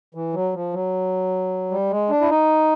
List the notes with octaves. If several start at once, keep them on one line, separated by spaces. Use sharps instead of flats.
E3
F#3
F3
F#3
G3
G#3
D4
E4
D#4